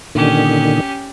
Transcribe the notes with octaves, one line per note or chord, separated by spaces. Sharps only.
A#2 D3 D#3 C#4 G4